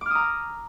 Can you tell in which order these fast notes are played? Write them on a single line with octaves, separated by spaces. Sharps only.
D6 F6 D#6 A#5